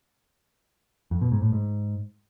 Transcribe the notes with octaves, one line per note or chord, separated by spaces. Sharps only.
F2
B2
G#2
A2
G#2